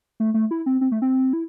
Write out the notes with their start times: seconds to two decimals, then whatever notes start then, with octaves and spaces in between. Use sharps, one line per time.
0.20 A3
0.34 A3
0.51 E4
0.66 C4
0.81 C4
0.92 A3
1.02 C4
1.33 E4